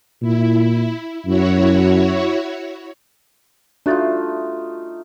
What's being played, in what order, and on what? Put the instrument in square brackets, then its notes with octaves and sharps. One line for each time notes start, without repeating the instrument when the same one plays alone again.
[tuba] A#2 [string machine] E4
[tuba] F#2 [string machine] E4 F#4 C#5
[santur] A3 D#4 F4 [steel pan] D4 [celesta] F#4 F#6 A6